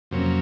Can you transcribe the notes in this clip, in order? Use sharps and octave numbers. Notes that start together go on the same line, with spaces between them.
F2 C3 F#3 A#3 C#4